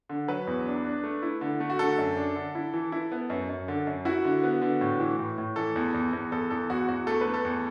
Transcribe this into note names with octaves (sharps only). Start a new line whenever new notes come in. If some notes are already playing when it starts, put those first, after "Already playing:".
D3
F#3 B4
E2
D4
D4
A3
E4
D3
A3
F#4
D3 A4
F#2
D4
D3
E4
E3
E4
B3
F#2
F#2
D3
F#2
E4 F#4
D3
B3
D3
A2
E3
A2
A2
E3 A4
E2
E2
E2
E2 A4
E2 A4
E2 F#4
E2 F#4
A3 A4
B4
A3
A4
E2